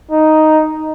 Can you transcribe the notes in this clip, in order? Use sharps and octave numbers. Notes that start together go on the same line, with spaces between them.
D#4